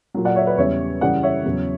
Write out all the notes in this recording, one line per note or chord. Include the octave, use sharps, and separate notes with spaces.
A#2 F#3
D5 F#5
C#5 E5
B4 D5
E2 C#3 G3 C#5 E5
F#2 C#3 E3 G3 D5 F#5
C#5 E5
E2 C#3 F#3